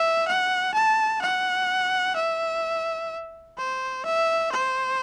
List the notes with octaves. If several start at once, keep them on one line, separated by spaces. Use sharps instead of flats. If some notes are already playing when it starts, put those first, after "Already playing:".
Already playing: E5
F#5
A5
F#5
E5
C5
E5
C5